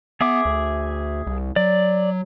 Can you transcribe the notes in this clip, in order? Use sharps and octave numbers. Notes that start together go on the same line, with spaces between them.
B3 G#4 E5 D6
D2
C2
F#3 D5